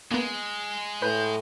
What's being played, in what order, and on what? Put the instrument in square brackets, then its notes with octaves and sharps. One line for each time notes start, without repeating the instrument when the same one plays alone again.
[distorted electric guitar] G#3 [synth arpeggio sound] A#3 B3
[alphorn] A2 [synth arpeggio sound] B4 [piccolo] G6